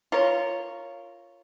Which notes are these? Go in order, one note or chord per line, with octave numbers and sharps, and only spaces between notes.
F4 A#4 C#5